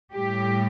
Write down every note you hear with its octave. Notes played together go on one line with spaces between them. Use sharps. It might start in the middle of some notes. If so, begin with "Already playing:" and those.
A2 G3 G4